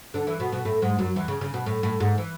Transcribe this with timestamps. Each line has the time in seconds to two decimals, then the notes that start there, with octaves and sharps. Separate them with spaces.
0.14 D3 D4
0.27 E3 E4
0.40 B2 B3
0.52 B2 B3
0.65 A2 A3
0.82 G#2 G#3
0.99 F#2 F#3
1.16 E2 E3
1.28 C#3
1.41 C#3
1.54 B2
1.66 A2
1.83 A2
2.00 G#2 G#3
2.18 E3